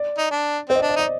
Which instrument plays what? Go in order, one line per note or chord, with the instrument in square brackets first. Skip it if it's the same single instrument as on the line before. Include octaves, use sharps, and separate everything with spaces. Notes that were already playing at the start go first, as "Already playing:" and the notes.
Already playing: [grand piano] D5
[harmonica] D#4
D4
[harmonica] C4 [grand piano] C5
[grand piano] D#5
D5
[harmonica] D4
[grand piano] D5
[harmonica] D#4 [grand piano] D#5